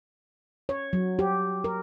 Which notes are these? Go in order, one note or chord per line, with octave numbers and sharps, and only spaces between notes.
C#5
F#3
G4
A#4